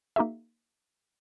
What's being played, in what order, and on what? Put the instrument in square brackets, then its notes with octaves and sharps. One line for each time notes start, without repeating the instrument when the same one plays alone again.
[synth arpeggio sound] A#3 D#4 F#4 G#4 E5